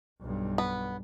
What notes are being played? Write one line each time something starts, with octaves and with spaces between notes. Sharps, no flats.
B1 G2
B3